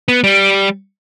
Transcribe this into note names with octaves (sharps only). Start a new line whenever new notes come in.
B3
G3